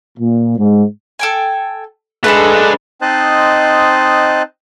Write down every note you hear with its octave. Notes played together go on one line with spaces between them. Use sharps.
A#2
G#2
A4 G5 G#5
G#3 A3 B3 D4 A4 B4
C4 D#4 C5 D#5 A5 F#6